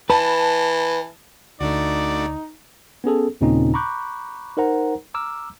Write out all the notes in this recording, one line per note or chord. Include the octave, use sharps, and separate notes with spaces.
E3 B4 A5
D2 A3 D4 D#4 F#4 D5
B3 C#4 G#4 A4
D#2 A#2 C#3 C4 C#4 D#4
A#5 B5 C#6 D6 F#6 G6
D#4 A#4 C5 F#5 A#5
A#5 D6 E6 F6